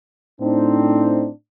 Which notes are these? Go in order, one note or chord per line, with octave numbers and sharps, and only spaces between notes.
A2 C4 D4 D#4